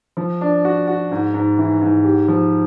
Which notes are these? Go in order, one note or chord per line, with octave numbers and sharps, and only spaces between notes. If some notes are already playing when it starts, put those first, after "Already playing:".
F3
D4
F#4
F#4
G#2
G#2
E3
G#2
G4
F3